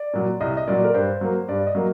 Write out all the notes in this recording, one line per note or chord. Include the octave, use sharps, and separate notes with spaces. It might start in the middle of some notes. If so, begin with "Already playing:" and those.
Already playing: D5
A#2 F#3
C2 D#5
D#5
A#2 F#3 D5
A#4
G2 C5
F#3 A#3
G2 D5
D#5
F#3 A#3